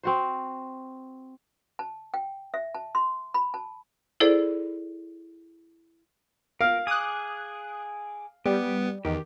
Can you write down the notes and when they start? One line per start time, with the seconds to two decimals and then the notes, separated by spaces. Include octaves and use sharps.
0.03 C4 F#4 C5
1.79 A5
2.14 G5
2.54 E5
2.75 A5
2.95 C6
3.34 B5
3.54 A5
4.20 E4 G#4 A4 C5 D5
6.61 A#4 F5
6.87 G#4 D6 D#6 F#6
8.46 G3 B3 G4
9.05 E2 D#3 G4